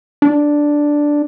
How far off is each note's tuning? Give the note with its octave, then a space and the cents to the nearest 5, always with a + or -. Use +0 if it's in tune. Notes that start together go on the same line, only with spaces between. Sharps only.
D4 +0